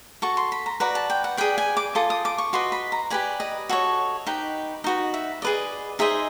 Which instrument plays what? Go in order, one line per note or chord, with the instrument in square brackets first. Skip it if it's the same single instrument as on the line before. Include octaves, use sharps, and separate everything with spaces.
[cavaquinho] F#4 A4 C#6
C6
B5
A#5
F#4 B4 D5 A#5
A5
G5
F#5
G#4 B4 D5 G5
G#5
D6
F4 A4 D#6
D#6
D6
C#6
F#4 B4 D#5 C6
B5
A#5
G4 B4 D5 G#5
D#5
F#4 A4 C#5
D#4 G4 B4
D#4 F#4 B4 D#5
E5
G#4 B4 D5 D#5
D#4 G#4 C5 D#5 E5